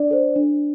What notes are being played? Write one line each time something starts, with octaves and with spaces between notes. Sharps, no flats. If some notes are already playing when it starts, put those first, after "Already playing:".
Already playing: D4 D5
A4 C5
D4